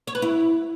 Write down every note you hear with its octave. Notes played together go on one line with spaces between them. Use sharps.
C#5
B4
E4